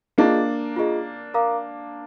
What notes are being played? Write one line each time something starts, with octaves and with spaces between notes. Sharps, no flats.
A#3 D4 F4 G#4 D#5
F4 G#4 D#5
A#4 F5 A#5 D6